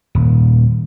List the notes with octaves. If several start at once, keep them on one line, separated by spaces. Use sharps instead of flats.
D#1